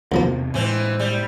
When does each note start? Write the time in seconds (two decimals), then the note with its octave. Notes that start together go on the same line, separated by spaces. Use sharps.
0.12 B1 E2 C3 F3 A#3 C4
0.54 A2 E3 G#3 C4
0.99 G3